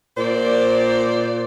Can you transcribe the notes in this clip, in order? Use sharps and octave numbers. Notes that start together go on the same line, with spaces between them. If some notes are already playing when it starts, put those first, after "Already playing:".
A#2 C5 D5